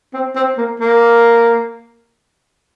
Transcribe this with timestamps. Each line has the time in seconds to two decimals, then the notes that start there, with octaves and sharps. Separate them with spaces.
0.14 C4
0.36 C4
0.57 A#3
0.80 A#3